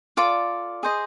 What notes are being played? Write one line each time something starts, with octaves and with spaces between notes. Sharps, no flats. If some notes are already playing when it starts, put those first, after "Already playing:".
F4 A4 D5 D6
G#4 C5 D#5